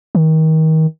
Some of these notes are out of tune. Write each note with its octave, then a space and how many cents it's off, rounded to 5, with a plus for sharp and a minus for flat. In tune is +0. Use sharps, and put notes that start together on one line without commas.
D#3 +30